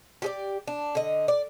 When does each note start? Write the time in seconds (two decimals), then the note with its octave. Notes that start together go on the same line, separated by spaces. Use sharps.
0.22 G4 G#4 D5
0.67 D4
0.95 D3 D#5
1.28 D5